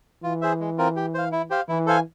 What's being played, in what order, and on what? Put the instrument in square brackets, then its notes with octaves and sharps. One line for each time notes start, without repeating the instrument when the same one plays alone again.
[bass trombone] E3 [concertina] F4
[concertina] G#4 C5 E5
G#3
C4 F4 A#4
G4
C5 F5
E4
G4 C5 F5
[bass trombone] E3 [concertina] E4
[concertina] A4 C5 F5 G#5